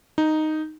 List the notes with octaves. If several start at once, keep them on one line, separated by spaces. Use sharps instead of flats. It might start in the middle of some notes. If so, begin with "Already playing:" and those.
D#4